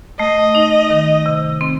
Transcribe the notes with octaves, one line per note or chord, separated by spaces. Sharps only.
A3 D#5
D#4
D#3
C3
C4